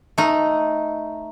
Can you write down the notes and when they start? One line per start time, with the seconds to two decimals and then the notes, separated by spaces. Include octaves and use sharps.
0.18 A3 D#4